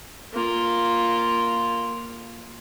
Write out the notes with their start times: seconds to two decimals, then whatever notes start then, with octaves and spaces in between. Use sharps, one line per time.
0.34 A#3 F4